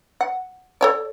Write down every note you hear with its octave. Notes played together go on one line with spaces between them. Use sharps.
F#5
A4 C#5 D5